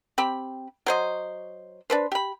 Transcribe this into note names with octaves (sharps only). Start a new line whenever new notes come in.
C4 G4 B5
F#3 C5 D#5
D4 B4 C5
G4 B5